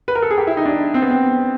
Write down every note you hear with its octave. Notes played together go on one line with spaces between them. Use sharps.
B4
A#4
A4
G#4
G4
E4
D#4
D4
C4
B3
C4